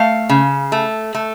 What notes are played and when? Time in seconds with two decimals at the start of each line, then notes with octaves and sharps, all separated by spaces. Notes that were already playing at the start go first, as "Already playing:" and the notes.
Already playing: A3 F5
0.29 C#3
0.72 A3
1.14 A3